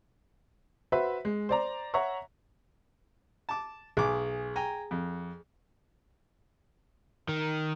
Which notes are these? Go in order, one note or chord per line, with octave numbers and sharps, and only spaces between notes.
F#4 B4 C5 E5
G#3
C5 D5 A#5
C#5 E5 F#5 A#5 C#6
A5 D6
B1 G#4 D6
G5 G#5 A#5
F2
D#3